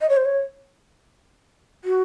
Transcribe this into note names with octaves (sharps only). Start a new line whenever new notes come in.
D#5
C#5
C5
C#5
F#4